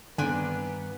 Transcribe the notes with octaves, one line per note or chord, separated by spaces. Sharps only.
G2 D3 D#3 B3 C4 D4 G#5